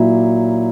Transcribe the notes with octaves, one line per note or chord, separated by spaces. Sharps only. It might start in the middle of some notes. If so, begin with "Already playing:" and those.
Already playing: A#2 F#3 A#3 E4